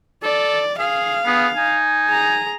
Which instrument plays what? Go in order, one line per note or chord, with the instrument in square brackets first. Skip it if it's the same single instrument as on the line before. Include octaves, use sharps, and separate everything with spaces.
[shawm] A4 [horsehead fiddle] D5
[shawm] G#4 [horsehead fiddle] F5
[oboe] B3 [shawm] G#4
[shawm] D#4 [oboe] G#5
[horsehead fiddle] G#4 A#5